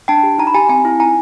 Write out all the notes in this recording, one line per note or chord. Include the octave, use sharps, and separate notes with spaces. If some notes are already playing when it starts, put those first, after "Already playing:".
D4 G5 A5
G4
D#4 A#5
B5
G4 G#5 A#5
C4 G#5 A#5
E4
D#4 G#5 A#5